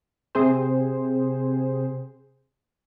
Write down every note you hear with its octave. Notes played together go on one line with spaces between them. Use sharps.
C3 C4 G#4 C5